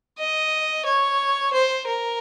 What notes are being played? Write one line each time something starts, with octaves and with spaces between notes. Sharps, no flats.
D#5
C#5
C5
A#4